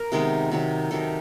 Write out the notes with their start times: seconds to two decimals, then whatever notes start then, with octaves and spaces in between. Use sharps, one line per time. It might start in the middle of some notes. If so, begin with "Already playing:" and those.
Already playing: A#4
0.12 C3 D#3 G#3 B3
0.51 C3 D#3 F#3
0.91 C3 D#3 F#3 A4